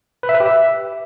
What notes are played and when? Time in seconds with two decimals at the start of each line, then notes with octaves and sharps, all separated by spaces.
0.23 B4
0.29 E5
0.35 B4
0.40 G4
0.46 E5